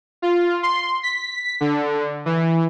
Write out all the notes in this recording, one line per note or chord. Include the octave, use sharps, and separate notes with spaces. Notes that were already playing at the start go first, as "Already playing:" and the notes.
F4
C6
B6
D3
E3